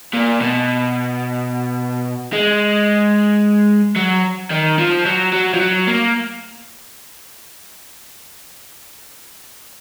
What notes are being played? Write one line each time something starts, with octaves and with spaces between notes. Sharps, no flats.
A#2
B2
G#3
F#3
D#3
F3
F#3
F#3
F3
F#3
A#3